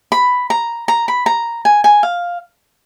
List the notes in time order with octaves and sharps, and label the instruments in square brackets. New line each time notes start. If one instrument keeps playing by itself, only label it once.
[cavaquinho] B5
A#5
A#5
B5
A#5
G#5
G#5
F5